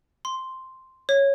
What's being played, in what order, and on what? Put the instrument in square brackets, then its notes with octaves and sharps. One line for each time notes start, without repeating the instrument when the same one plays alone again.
[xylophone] C6
C#5